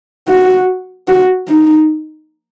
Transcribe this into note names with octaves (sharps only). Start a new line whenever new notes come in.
F#4
F#4
D#4